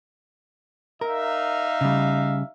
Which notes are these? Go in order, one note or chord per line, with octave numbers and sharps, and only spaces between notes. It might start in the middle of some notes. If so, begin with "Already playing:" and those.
D#4 A#4 E5 F5
C#3 G3